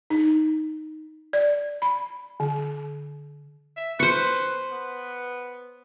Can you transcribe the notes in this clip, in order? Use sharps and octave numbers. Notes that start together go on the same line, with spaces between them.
D#4
D5
B5
D3
E5
B4 C5 C#6
B3